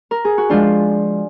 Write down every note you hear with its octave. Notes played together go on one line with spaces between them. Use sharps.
A#4
G#4
F#4
F3 G#3 D4 F4